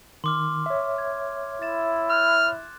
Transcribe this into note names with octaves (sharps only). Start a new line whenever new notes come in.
D#3 C6 D6 F6
C#5 E5
G#6
E4 A6 E7
F6 F#6